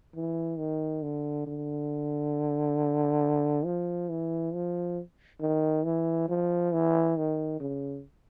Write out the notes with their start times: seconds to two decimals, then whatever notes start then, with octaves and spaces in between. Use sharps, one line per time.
0.15 E3
0.58 D#3
1.03 D3
1.47 D3
3.65 F3
4.09 E3
4.54 F3
5.41 D#3
5.85 E3
6.29 F3
6.73 E3
7.17 D#3
7.60 C#3